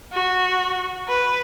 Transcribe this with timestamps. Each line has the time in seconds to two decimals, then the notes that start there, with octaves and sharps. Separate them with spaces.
0.13 F#4
1.08 B4